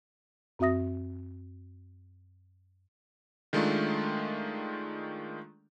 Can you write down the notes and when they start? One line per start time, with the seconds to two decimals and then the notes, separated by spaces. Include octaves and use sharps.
0.59 F#2 C4 F#4 E5 D#6 A#6
3.53 D#3 G#3 A3 D4 F4